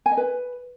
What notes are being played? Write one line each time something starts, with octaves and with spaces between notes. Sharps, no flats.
G#5
D#5
B4